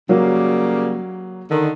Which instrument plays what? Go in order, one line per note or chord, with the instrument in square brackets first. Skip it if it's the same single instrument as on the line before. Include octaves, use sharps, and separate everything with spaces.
[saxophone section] C#3 G3 A#3 [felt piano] F#3
[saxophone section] D3 D#3